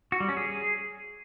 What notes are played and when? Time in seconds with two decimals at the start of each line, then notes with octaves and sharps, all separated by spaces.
0.12 F#4
0.20 G3
0.29 C#4
0.37 G#4